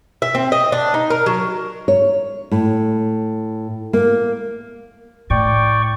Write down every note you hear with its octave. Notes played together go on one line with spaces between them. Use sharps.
E5
C4
D#5
D4
D#4
A#4
F#3
C#5
A2
A#3
A2 D5 G5 C#6